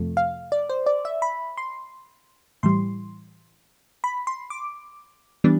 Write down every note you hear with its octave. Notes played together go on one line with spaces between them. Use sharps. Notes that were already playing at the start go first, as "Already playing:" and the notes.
Already playing: F2 C3 F3 A3
F5
D5
C5
D5
E5
B5
C6
A2 E3 G3 C6
B5
C6
D6
E3 G3 B3 D4